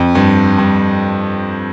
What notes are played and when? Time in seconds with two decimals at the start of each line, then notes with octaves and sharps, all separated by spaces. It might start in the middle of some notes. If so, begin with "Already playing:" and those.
Already playing: F2
0.15 G2
0.59 G2